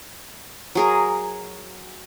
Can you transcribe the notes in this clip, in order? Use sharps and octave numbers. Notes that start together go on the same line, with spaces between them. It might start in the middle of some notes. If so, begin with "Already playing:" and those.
F#3 G#4 A#4